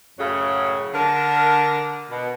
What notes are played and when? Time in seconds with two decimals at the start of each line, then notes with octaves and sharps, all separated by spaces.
0.18 F#2 A2 C#3 F#3
0.94 D3 D4 A#4
2.10 B2